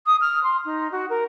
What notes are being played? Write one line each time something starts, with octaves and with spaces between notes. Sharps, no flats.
D#6
F6
C6
D#4
F#4
A#4